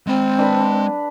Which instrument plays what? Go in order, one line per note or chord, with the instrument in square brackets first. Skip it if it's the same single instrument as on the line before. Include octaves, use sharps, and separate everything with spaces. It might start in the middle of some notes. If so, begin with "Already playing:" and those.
[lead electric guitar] G#3 B5 [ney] C4
[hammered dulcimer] D4 B4